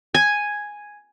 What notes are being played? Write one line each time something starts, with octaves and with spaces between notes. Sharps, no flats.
G#5